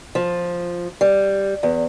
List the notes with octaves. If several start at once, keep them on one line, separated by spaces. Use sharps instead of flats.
F3
G3
E2